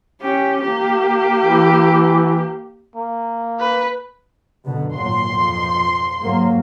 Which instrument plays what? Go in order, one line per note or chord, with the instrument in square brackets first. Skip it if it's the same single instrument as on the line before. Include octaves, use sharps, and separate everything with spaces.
[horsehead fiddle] C#4 G4
A#3 G4
[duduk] E3
[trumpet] A#3
[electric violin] B4
[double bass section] F#2 B2 D3
[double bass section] G#1 A#2 F#3 [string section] C6
[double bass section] F2 B2 F3
G#2 F#3 A#3